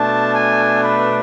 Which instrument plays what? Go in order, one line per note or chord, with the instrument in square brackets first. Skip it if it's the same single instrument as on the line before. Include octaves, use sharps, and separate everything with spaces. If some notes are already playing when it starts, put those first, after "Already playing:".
Already playing: [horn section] B2 A3 D4 A5
G#5
B4